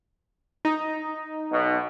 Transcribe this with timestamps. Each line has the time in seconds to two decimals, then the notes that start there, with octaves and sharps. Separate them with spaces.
0.65 D#4
1.52 B1 B2